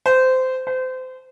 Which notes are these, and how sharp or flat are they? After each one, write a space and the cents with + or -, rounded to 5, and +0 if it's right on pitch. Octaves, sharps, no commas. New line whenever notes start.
C5 -20
C5 -30